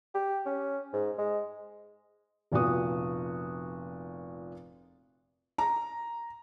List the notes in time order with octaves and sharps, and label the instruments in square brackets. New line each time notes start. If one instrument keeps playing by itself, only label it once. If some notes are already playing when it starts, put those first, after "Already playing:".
[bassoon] G4
C#4
G#2
G#3
[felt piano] F1 A#2 B3 F#4 D#6
A#5